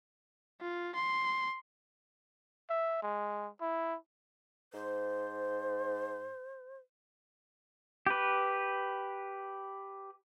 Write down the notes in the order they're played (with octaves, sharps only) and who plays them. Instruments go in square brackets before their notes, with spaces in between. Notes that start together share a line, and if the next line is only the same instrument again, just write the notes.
[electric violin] F4
C6
[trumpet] E5
G#3
E4
[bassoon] G#2 [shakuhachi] C5
[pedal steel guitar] G4 B4